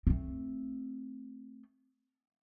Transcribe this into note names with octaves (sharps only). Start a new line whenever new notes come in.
A3 C4